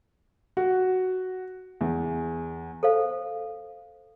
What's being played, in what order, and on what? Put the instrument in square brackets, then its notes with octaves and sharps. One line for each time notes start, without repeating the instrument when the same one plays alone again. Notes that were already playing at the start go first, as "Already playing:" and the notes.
[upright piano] F#4
E2
[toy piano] A4 C5 F5